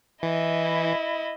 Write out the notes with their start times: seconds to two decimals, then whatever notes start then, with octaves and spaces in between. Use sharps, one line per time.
0.23 E3 E4 D#5